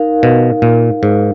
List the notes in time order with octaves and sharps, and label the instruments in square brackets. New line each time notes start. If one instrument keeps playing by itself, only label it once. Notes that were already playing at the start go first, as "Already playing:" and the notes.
Already playing: [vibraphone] D#4 A#4 F5
[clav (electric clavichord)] B2
A#2
G#2